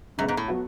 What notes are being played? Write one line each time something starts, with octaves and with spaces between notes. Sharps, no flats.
F#2 C#3 G#3 B3
G#2
A2
F#3 B3 F#4